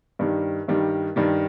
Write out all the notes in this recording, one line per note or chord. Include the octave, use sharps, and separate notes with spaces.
G2 D#3 G3
G2 D#3 G3
G2 D#3 G3